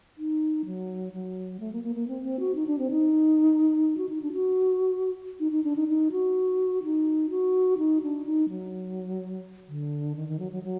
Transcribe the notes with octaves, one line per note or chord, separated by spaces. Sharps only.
D#4
F#3
F#3
A3
A#3
A#3
A#3
C4
C4
F#4
D#4
D4
C4
D#4
F#4
D#4
D4
F#4
D#4
D#4
D4
D#4
D#4
F#4
D#4
F#4
D#4
D4
D#4
F#3
D3
D#3
D#3
F#3
F#3
F#3